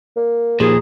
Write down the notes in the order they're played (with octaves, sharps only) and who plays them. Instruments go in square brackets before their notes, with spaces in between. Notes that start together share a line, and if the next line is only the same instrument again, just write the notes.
[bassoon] A#3
[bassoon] D#2 [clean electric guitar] A#2 F3 [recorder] G#4